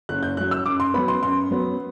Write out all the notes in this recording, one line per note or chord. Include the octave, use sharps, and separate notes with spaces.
F#1 F#6
G6
F#2 F#3 F#6
E6
F#2 D6
C6
F#3 B3 B5
C6
F#2 C6
F#3 B3